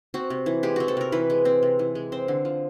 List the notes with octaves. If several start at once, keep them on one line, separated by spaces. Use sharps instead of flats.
C4 F#4
C3
E3
G#3 G4
C4 F#4
A4
C3 A#4
E3 B4
G#3
C4
C3
E3
G#3
C4 C5
D3
F3